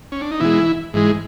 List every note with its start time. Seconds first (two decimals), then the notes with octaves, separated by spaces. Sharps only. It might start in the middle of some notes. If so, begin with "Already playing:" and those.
0.12 C#4
0.21 D4
0.31 D#4
0.40 B2 E3 G#3 E4
0.94 G#2 E3 G#3